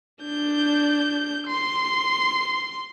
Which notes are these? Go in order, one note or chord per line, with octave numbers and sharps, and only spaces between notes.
D4 G6
C6